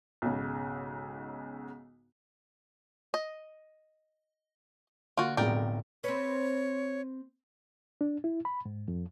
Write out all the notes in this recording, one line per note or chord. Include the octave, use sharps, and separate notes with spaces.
B1 G#2 C#3
D#5
D3 A#3 F4 F#4 D7
B1 F2 A2 G#3 A#4 D5 G5
C4 B4 C#5
D4
E4
B5
G#2
F2